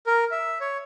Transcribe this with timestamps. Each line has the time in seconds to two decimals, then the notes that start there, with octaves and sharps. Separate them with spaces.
0.07 A#4
0.31 E5
0.61 C#5